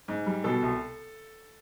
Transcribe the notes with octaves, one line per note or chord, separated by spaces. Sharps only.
G#2
G3
B2 A4
C2